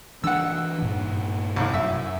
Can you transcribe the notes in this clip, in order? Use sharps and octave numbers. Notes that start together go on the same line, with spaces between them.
E3 D4 F#5 E6
G2 A#2
C2 A2
F#2 E5